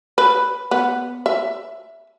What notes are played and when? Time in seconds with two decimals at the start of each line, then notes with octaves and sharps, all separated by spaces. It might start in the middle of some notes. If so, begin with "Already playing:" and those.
0.18 B4
0.71 B3
1.26 E5